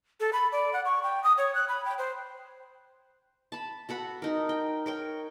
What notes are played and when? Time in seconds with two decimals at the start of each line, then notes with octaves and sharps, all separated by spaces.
0.20 A4
0.33 B5
0.52 D5
0.73 F#5
0.85 C#6
1.03 G5
1.24 D#6
1.38 C#5
1.55 F#6
1.69 B5
1.85 G5
1.99 C5
3.52 A5 B5
3.89 F#4 A4 F#5 B5
4.22 D#4 A#4
4.49 G5
4.86 A#4 C#5 G5